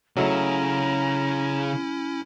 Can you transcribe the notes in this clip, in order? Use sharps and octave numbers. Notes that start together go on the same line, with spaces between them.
C#3 F#3 A3 C#4 E4 A#5